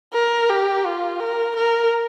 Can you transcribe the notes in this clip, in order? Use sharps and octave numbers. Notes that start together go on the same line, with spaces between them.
A#4
G4
F4
A#4
A#4